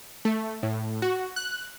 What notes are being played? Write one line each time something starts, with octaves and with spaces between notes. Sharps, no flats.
A3
A2
F#4
F#6